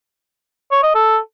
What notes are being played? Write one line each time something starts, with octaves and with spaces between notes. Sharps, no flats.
C#5
D#5
A4